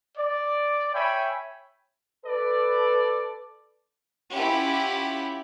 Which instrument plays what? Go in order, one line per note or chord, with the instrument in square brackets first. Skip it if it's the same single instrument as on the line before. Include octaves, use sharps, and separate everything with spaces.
[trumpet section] D5
C#5 E5 G5 G#5 B5
[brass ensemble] A4 B4 D5
[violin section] C#4 E4 F4 G4 F#5 B5